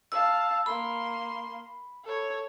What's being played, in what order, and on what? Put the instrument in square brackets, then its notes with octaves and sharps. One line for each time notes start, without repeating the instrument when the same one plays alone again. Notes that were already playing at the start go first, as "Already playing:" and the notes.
[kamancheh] F5 A5 [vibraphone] E6
[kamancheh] A#3 C6 [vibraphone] B5
[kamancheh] A4 C#5